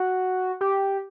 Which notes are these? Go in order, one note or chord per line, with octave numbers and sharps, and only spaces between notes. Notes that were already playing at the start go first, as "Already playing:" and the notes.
Already playing: F#4
G4